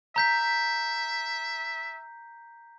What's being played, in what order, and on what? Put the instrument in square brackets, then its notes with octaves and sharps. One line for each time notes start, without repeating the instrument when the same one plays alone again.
[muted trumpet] E5 [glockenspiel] A#5 G6 B6